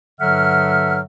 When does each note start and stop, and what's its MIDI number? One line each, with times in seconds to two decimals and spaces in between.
0.20 1.00 43
0.20 1.00 50
0.20 1.00 54
0.20 1.00 76
0.20 1.00 78
0.20 1.00 89